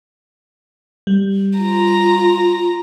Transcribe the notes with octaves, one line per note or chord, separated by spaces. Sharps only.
G3
F4 A#5